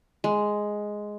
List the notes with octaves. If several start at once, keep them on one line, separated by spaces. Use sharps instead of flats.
G#3